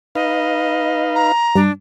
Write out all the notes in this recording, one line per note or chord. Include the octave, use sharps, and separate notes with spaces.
D#4 B4 D#5 F5
A#5
G2 D4